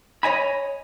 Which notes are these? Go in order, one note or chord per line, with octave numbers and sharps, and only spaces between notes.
C#5 D#5 G#5 B5